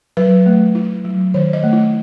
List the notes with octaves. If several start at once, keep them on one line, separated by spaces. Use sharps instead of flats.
F#3 B4
A3
E4
F#3
D#3 C#5
D#5
A3
E4